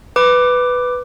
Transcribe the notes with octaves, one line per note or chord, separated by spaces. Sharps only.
B4 D6